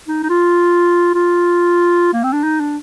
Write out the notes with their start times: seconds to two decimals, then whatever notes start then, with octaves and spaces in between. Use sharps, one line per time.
0.08 D#4
0.23 D#4
0.29 F4
1.15 F4
2.13 A#3
2.24 C4
2.33 D4
2.44 D#4
2.60 D4